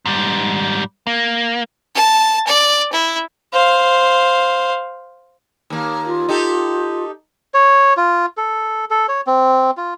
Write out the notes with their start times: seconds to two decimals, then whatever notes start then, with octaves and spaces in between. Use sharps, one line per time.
0.06 G#2 G3
1.07 A#3
1.95 A5
2.47 D5
2.93 E4
3.53 C5 F5
5.70 D#2 A#3
6.07 F4
6.29 D#4 G4 A4
7.54 C#5
7.97 F4
8.37 A4
8.90 A4
9.08 C#5
9.27 C4
9.77 F4